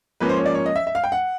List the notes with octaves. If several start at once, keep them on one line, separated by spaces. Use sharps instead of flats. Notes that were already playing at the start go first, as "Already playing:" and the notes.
G#2 F3 A#3 C#4 B4
C5
C#5
D5
C#5
D#5
E5
E5
F5
G5
F#5